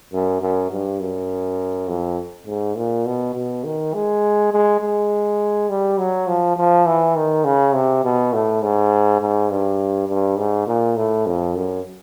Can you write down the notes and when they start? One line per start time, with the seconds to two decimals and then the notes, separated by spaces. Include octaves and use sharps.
0.13 F#2
0.42 F#2
0.71 G2
1.00 F#2
1.88 F2
2.47 G#2
2.77 A#2
3.06 B2
3.34 B2
3.64 D#3
3.94 G#3
4.52 G#3
4.81 G#3
5.69 G3
5.98 F#3
6.27 F3
6.57 F3
6.86 E3
7.16 D#3
7.44 C#3
7.74 C3
8.04 B2
8.33 A2
8.62 G#2
9.21 G#2
9.50 G2
10.08 G2
10.38 G#2
10.67 A#2
10.96 A2
11.26 F2
11.55 F#2